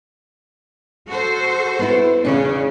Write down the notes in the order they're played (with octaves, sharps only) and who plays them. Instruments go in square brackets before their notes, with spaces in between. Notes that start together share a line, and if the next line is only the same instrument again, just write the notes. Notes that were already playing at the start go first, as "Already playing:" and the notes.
[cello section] F#4 A4 C5
[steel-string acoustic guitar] B3 E4
[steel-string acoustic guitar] E2 G2 D4 [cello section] C#3 C#4